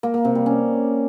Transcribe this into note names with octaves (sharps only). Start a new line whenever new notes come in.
A#3
A#3
C3
G3
C#4